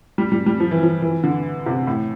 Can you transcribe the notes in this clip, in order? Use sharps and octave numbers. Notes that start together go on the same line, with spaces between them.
G3
G3
G3
F3
E3
F3
E3
D3
C3
A2